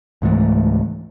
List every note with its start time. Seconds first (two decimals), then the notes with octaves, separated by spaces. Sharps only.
0.22 C#2 G#2 E3 A3